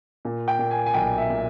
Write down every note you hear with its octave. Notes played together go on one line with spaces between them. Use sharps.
A#2
G5
A#2
G#5
G#5
B1 G5
E5
A#2